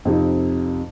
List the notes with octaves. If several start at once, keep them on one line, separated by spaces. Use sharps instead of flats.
F2 C3 D#4